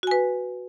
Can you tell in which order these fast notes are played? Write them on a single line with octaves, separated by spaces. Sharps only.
F#4 G#5 B4